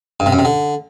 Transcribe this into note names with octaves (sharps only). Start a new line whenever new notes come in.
G2
C3
F#2
C3
D3